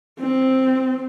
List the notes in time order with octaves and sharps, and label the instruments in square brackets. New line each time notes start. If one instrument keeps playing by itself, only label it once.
[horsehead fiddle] C4